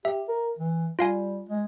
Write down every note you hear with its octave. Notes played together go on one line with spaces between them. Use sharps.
G4 E5
A#4
E3
G3 F4 F5 G#5
G#3